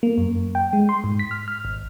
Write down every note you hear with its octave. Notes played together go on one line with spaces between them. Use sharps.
A#3
F#2
G5
G#3
C6
G#2
B6
F6
F6
G#1